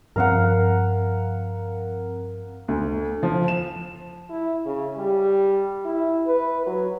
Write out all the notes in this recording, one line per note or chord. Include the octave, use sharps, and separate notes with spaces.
G2 F3 C4 A#4 F5 F#5
D2
F3
E7
E4
C#3
G3
E4
B4
F#3